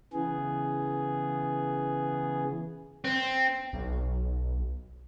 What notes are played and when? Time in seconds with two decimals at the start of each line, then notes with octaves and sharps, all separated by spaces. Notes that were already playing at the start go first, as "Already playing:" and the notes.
0.13 C#3 E3 B3 G#4
3.05 C4
3.73 B1